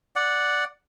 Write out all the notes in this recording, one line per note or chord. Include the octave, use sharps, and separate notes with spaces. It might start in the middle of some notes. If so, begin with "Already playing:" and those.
D5 F#5